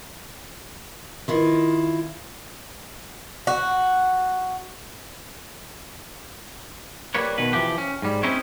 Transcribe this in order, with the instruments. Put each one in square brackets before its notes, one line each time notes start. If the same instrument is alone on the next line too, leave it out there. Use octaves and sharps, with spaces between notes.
[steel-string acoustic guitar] D#3 E4 F4
[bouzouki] F#4
[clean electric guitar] G3 A#3 B4 C#5
B2 D#3 B4
E3 F3 G4
C#4
G#2 G3
C4 C#4 D#4 E4 C5 C#5